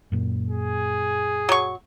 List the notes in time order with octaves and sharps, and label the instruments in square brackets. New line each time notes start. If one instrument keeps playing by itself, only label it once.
[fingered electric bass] F#2 A#2
[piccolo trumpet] G#4
[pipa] F#3 C#6